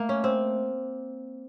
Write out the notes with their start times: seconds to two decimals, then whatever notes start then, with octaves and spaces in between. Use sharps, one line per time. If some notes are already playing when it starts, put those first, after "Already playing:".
Already playing: A3 A#3
0.09 C#4
0.24 C4